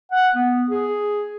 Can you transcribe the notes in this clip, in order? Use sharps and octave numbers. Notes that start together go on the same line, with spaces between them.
F#5
B3
G#4